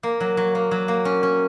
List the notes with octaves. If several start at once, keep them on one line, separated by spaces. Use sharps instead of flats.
A#3
F#3
F#3
A#3
F#3
A#3
C#4
C#4